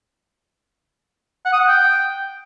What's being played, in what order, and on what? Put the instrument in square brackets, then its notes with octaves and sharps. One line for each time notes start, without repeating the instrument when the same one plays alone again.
[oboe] F#5
D#6
F#5
G5